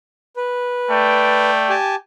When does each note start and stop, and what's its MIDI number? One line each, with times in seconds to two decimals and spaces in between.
0.37 1.51 71
0.89 1.75 57
0.89 1.75 74
0.89 1.75 79
1.69 1.95 67
1.69 1.95 80
1.69 1.95 81